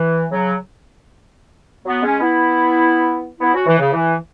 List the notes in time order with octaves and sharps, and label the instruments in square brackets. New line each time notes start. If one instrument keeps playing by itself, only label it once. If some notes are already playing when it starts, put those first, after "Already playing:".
Already playing: [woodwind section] E3
C#3 F#3
F#3 B3
G#3 C#4
B3 E4
B3 E4
C#4 F#4
E3
C#3
E3